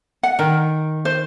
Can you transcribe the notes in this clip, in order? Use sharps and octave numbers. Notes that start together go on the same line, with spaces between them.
F#5
D#3 A#4
C5